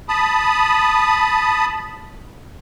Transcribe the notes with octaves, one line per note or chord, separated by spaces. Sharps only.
A5 B5 D#6